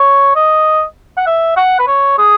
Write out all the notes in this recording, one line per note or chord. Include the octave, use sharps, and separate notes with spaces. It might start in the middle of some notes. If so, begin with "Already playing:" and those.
Already playing: C#5
D#5
F#5
E5
F#5
B4
C#5
G#4